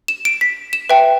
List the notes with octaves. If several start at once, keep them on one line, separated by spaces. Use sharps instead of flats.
E7
D7
B6
E7
B4 E5 G5